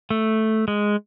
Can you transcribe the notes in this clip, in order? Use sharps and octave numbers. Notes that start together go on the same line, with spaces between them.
A3
G#3